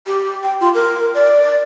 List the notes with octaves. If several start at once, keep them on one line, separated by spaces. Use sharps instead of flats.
G4
G5
F4
A#4
D5